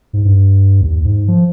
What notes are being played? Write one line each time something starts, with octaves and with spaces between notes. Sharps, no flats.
G#2
G2
D#2
G#2
F3